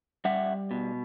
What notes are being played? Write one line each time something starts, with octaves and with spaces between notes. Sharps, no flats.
G3 E5 F#5
B2